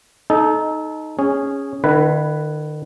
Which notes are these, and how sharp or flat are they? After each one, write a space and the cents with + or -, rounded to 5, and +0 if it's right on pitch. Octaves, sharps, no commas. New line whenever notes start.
D#4 +0 A4 -30
C#4 +0 G#4 -10
D#3 -45 E4 +20 B4 +0